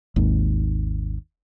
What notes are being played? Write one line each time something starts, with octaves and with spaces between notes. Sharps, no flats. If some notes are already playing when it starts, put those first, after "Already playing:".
G#1 D#2